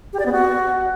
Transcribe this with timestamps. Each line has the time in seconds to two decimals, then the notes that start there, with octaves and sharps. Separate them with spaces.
0.13 G4
0.19 D5
0.26 B3
0.32 F#4